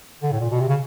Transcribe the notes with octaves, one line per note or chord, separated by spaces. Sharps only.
D3
A2
A#2
B2
C3
C#3